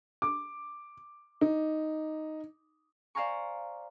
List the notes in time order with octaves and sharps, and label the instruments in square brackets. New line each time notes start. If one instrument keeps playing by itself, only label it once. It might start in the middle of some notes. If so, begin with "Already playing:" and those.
[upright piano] D6
D#4
[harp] C5 D5 F5 G#5 A#5 C#6